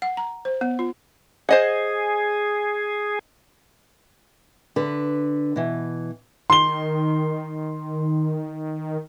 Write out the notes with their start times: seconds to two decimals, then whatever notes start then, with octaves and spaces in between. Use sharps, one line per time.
0.02 F#5
0.17 A#5
0.45 C5
0.61 B3
0.79 F4
1.49 G#4 C5 D#5 F#5
4.76 D3 B4
5.56 B2 E3
6.50 D#3 C6 G7